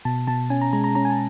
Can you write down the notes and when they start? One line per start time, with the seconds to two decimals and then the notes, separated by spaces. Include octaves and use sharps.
0.05 B2 A5
0.27 B2 A5
0.50 C#4 G#5
0.61 A#5
0.73 G#3 A#5
0.84 A#5
0.95 C#4 A#5
1.05 G#5
1.10 A5